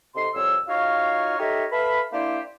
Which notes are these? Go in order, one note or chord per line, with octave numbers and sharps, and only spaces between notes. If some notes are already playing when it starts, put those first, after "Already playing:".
C3 D#4 A4 C6
C2 F2 C#5 E6
D#4 F4 F#4 C#5 F5
D#4 G4 A4 A#4 C#5 E5
A4 B4 E5 F5 B5
A#3 D4 E4 G4 C5 E5